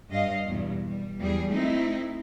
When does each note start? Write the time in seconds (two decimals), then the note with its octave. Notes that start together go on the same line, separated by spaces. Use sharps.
0.11 G2 D#5 F5
0.47 E2 G2 B2
0.86 G3
1.20 E2 G3 G#4
1.52 A3 C4 D#4 E4